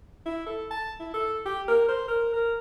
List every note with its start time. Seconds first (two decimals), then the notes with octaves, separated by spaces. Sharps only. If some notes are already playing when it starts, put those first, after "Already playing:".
0.25 E4
0.46 A4
0.71 A5
1.00 E4
1.14 A4
1.45 G4
1.68 A#4
1.88 C5
2.08 A#4
2.33 A#4